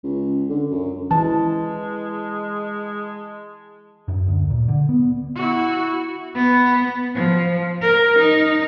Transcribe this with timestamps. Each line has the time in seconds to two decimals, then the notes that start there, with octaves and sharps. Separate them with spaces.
0.03 C#2
0.50 D3
0.71 F#2
1.11 E3 G#3 A5
4.08 F#2
4.28 D2
4.50 A#2
4.68 D3
4.89 B3
5.35 E4 F#4
6.35 B3
7.15 F3
7.82 A#4
8.19 D#4